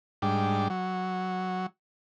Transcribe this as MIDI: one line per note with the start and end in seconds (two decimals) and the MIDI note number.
0.22 0.68 44
0.22 0.68 55
0.22 0.68 62
0.70 1.66 54